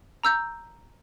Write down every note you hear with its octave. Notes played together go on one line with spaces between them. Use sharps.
A#5 E6 G6